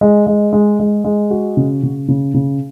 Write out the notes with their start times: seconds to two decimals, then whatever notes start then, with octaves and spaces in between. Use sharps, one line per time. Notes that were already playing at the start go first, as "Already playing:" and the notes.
0.01 G#3
0.27 G#3
0.53 G#3
0.79 G#3
1.04 G#3
1.31 F#4
1.57 C#3
1.83 C#3
2.08 C#3
2.34 C#3